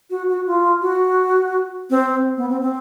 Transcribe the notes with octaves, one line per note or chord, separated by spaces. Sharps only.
F#4
F#4
F4
F#4
C4
B3
C4
C4